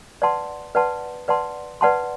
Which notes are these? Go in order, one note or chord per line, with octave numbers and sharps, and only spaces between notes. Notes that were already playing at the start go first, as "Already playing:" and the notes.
B4 D5 F#5 A5 C6
B4 D5 F#5 A5 C6
B4 D5 F#5 A5 C6
B4 D5 F#5 A5 C6